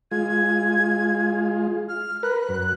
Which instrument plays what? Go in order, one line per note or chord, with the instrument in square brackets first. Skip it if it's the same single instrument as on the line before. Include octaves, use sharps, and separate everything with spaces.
[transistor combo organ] G#3 F4 [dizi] G#6
[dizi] F6
[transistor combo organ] A#4 B4 [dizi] F#6
[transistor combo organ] F#2